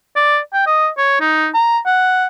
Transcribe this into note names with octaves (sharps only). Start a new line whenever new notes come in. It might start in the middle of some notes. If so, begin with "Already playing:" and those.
D5
G5
D#5
C#5
D#4
A#5
F#5